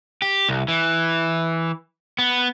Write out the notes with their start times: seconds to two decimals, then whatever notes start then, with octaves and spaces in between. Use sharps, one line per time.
0.22 G4
0.49 C2
0.68 E3
2.18 B3